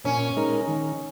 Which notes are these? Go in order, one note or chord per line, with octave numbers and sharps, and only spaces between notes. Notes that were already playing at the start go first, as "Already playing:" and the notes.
A#2 C#4
G#3 D#4 A#4
D#3